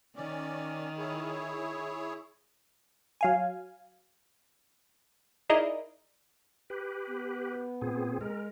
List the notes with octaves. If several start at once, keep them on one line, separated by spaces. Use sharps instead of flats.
D#3 C#4 D5
E4 G#4 C#5
F#3 F5 G#5
D#4 E4 G#4 A#4 D5 D#5
G4 B4
B3
A#2 C4 G#4
G#3 A#4